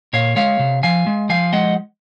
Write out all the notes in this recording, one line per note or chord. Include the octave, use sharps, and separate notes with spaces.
A#2 C#5 F5
G#3 C#5 F5
C3
F3 F5 G#5
G#3
F3 F5 G#5
G#3 D#5 F#5